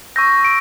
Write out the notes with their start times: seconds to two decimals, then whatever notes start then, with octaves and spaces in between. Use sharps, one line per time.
0.16 C#6 E6 G6 A#6
0.45 D7